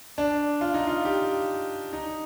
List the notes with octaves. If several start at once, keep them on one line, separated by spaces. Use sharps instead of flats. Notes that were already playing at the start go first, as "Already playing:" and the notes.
D4
F4
D#4
F4
G4
D#4